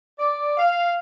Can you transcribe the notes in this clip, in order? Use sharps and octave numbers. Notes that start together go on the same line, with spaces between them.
D5
F5